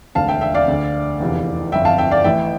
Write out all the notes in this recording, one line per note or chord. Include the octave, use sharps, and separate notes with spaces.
E1 D2 D3 F5 A5
E5 G5
E5 G5
D5 F5
D2 D3
F1 E2 C3 E3
G1 F2 E3 E5 G5
F5 A5
E5 G5
D5 F5
A1 A2 E3 E5 G5